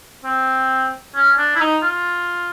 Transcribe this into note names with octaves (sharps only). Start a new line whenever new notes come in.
C4
C#4
D4
E4
D#4
F4